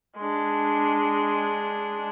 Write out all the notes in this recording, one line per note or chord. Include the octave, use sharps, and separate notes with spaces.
G#3 D4